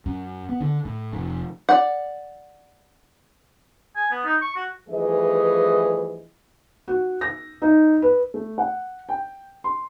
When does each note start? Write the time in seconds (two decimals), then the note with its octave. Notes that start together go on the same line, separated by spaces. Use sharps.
0.06 F#2
0.49 B3
0.60 D3
0.85 A2
1.13 F1
1.69 D5 F#5
3.96 G#5
4.11 B3
4.25 D#4
4.41 C#6
4.56 F#4
4.89 G2 E3 F3 A3 G#4 D#5
6.88 F#4
7.21 A#6
7.62 D#4
8.02 B4
8.34 A3
8.58 F#5
9.09 G5
9.64 C6